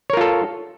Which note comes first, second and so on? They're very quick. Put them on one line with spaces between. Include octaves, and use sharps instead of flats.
C#5 A#4 F4 A4